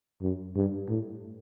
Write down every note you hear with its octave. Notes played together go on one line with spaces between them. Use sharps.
F#2
G2
A2